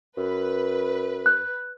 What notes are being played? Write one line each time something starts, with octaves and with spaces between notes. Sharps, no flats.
F#2 B4
F#6